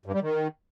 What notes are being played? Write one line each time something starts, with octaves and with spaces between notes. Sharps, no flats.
G2
G3
D#3